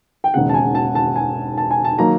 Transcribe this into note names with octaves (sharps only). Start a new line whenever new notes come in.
G5
E1 D#2 C#3 F#5
A5
G#5
A5
A5
G#5
A5
G#5
A5
D#3 F#3 A#3 A#5